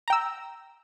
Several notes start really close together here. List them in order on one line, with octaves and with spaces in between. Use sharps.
A#5 G5 E6